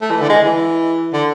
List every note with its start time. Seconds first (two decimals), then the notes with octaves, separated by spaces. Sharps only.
0.01 A3
0.11 E3
0.21 D3
0.29 G#3
0.45 E3
1.14 D3